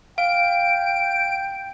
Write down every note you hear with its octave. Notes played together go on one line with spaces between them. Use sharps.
F5 G5 D7